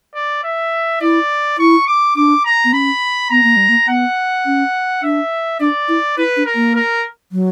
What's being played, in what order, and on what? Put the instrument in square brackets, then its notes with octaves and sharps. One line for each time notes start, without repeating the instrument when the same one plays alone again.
[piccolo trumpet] D5
E5
[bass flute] E4 [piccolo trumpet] D5
[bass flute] E4 [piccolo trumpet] C#6
[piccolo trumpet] D6
[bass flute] D4 [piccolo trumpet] D6
[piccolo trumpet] A#5
[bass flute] B3
[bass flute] C#4 [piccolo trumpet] B5
[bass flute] B3 [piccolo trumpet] A#5
[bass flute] A#3
G3
A#3
[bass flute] B3 [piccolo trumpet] F#5
[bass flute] C#4
[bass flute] D4 [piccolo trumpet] E5
[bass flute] D4 [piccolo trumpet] D5
[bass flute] E4
[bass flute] E4 [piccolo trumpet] B4
[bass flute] D4
[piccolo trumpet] A#4
[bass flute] A#3
[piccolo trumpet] A#4
[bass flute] F#3